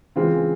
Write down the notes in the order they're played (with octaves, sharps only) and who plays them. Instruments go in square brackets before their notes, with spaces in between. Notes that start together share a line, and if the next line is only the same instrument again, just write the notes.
[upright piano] C#3 E3 G#3 C4 F4